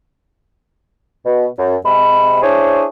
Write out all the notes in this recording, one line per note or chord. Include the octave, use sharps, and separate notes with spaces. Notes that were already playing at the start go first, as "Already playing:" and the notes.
B2
F#2
C3 G#3 B5
D4 E4 G#4 C5 C#5